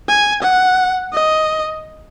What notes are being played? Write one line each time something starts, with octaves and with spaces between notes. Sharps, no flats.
G#5
F#5
D#5